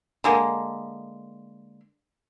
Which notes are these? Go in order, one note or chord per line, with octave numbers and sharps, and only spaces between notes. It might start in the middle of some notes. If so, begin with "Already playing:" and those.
D3 G#3 A#3